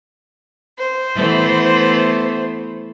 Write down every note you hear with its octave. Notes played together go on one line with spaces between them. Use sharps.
C5
E3 A3 B3